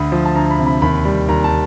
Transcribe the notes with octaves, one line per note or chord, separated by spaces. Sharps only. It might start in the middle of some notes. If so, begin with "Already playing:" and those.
Already playing: D2 B5
F3
A5
D2 A#5
B5
C3
B5
D#2 B5
G3
D#2 A#5
A5